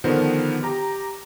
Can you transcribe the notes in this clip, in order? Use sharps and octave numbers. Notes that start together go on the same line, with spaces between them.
D3 D#3 F3 B3 A#4 C5
G4 A#5